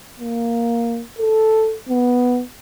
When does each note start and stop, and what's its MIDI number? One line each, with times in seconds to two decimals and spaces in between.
0.20 1.02 58
1.19 1.75 69
1.89 2.42 59